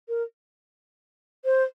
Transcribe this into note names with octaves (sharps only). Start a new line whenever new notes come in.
A#4
C5